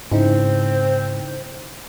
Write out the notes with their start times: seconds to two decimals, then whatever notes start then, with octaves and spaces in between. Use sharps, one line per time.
0.11 G#2 C#3 C4 D#4 E4 C5